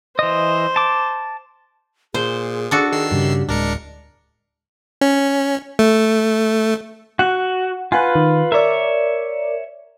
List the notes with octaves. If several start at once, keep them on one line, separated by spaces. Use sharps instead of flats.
E3 C5 D#5
A5 D6
A#2 G#4 C5
D4 F#4 A4
D#3 E6 C7
G2 C#3 G4
D1 G#3 D4 A#4 C#7
C#4
A3
F#4 F#5
F4 B4 F#5 G#5
D#3
A#4 C#5 D5 E5